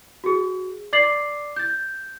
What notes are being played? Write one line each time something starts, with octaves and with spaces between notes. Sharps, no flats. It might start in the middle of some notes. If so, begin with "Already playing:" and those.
F#4 G#4
D5 D6 A6 C7 F#7
G6 A6